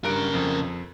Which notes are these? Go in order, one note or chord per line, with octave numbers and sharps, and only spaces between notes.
G2 C#3 A#4 F#6 D7
F2